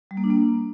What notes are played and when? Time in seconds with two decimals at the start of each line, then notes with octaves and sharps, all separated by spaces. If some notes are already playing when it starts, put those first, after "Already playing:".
0.11 G3
0.17 A#3
0.24 D4
0.30 A#3